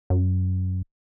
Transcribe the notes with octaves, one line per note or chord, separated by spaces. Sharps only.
F#2